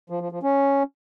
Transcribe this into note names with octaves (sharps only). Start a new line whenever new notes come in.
F3
F3
F3
C#4